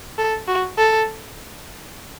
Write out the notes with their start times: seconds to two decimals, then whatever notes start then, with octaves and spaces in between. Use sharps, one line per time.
0.18 A4
0.48 F#4
0.78 A4